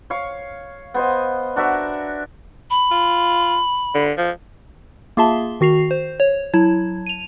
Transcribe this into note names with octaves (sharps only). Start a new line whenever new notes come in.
C#5 F5 C#6
B3 C5 D#5
D4 F#4 A#4 E5
B5
F4
D3
F3
A#3 F4 G#4 E5 A5 G7
D#3 F#4 C7 F7
C5
C#5
F#3 E4 A5 G#6
D#7 F7